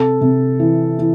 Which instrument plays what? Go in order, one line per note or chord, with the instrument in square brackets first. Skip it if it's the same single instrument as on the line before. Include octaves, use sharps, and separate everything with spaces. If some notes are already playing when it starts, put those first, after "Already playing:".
Already playing: [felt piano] C3 [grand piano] A4
[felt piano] C3
E3
E3